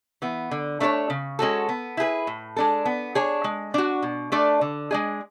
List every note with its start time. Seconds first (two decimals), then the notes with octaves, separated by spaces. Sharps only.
0.22 E3 B3
0.51 D3
0.80 A3 D4 A4 C#5
1.10 C#3
1.39 G#3 C#4 F#4 A4
1.69 B3
1.97 E4 G#4 B4
2.27 A2
2.56 G#3 D4 A4
2.85 B3
3.15 D4 G#4 C#5
3.44 G#3
3.74 D4 F#4
4.02 B2
4.32 A3 D4 A4 D5
4.61 D3
4.91 G#3 D4 G#4